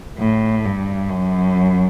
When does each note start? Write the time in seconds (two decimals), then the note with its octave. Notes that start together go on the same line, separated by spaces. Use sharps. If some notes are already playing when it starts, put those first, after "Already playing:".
0.18 A2
0.64 G2
1.09 F#2